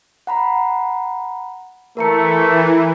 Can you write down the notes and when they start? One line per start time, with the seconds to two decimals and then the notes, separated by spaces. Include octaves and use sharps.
0.27 F#5 A#5 B5
1.97 E3 A3 A#4 A#5 C#7